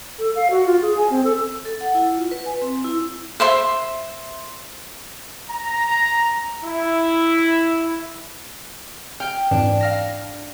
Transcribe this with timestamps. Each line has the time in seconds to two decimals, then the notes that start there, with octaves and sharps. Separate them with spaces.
0.19 A4
0.36 F5
0.51 F#4
0.66 F4
0.82 G#4
0.97 G#5
1.10 C4
1.24 A4
1.65 A4
1.81 F#5
1.95 E4
2.17 F4
2.31 B4
2.46 G#5
2.62 C4
2.84 E4
3.40 C5 E5 C6
5.49 A#5
6.63 E4
9.20 G5 F6
9.51 F2 G#2 E3 D4
9.81 F5 F6 A#6